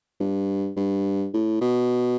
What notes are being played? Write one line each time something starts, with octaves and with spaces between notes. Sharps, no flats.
G2
G2
A2
B2